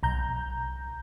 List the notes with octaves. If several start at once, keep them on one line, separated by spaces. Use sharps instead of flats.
B1 A#5 G6